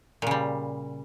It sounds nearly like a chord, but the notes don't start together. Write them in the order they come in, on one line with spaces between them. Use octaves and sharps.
A#2 C#3 G3